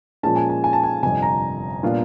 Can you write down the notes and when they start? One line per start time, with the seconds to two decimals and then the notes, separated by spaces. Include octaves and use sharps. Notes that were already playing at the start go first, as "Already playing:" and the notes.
0.23 A#2 F3 G#3 C#4 A5
0.36 G#5
0.49 G#5
0.64 G#5
0.73 A5
0.83 G#5
1.03 G1 F2 C3 G#5
1.22 A#5
1.83 A#2 G3 B3 D4 F4